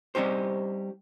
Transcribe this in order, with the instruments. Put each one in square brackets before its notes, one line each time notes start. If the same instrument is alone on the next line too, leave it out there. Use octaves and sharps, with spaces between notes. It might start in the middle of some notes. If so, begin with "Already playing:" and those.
[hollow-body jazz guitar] G3 C4 D#4 G4 C5